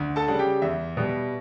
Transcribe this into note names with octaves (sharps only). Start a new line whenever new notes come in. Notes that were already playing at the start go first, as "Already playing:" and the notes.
Already playing: D2
A4 A5
C#3 G3 F#5
G4 G5
E2 E5
B2 G3